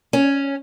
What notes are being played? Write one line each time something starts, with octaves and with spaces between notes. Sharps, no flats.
C#4